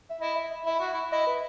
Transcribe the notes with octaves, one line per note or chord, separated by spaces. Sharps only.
E5
E4 D#5
E5
E4 E5
F#4
E4
E4 D#5
B4